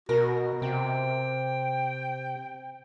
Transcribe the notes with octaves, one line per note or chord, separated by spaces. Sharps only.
B2 F#4 A#4
C3 G5